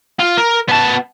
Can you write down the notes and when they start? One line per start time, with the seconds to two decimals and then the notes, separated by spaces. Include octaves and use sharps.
0.19 F4
0.37 A#4
0.69 B3 A5